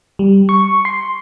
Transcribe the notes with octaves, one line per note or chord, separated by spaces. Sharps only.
G3
C#6
C6